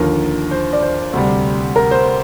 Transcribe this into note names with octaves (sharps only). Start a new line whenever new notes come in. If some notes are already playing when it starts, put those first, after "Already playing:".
Already playing: D#2 D3 F3 A#4
C5
D5
C5
D2 C3 G3
A#4
C5